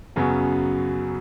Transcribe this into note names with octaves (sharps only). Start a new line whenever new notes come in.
F#2 C#3 F#3 B3